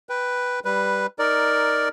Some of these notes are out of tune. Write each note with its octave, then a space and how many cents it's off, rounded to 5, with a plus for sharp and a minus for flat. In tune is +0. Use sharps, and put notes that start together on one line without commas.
B4 +0 G5 +0
G3 +0 B4 +0
D#4 +5 A#4 +0 D5 +0